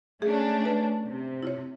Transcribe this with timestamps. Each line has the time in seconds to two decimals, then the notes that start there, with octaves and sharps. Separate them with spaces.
0.22 A3 C#4 D4 G#4 E5
0.62 B4 E5 G#5
1.06 C3
1.43 E4 F4 C#5